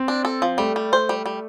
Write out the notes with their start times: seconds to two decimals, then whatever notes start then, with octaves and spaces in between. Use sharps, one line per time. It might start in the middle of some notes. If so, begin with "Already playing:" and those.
Already playing: C4
0.08 D4
0.25 A4
0.42 F3
0.58 G3 A3
0.76 G3
0.93 C5
1.09 G3
1.26 G3